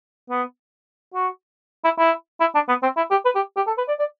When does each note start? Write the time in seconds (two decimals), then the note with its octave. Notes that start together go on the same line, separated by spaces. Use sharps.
0.30 B3
1.15 F#4
1.85 E4
1.99 E4
2.41 E4
2.55 D4
2.69 B3
2.83 C4
2.97 E4
3.11 G4
3.25 B4
3.36 G4
3.57 G4
3.67 A4
3.78 B4
3.88 D5
3.99 D5